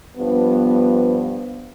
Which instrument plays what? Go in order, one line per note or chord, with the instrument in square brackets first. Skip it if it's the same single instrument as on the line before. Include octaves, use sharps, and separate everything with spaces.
[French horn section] G2 F3 B3